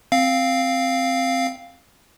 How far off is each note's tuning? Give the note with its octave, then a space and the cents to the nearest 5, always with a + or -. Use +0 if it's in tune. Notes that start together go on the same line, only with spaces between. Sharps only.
C4 +0 F5 +0